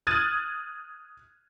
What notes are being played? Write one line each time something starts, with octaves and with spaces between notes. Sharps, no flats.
D#6 F6 F#6 G#6 A6 D#7